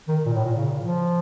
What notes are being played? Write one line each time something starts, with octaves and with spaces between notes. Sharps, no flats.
D#3
A#2
A2
A#2
C#3
F3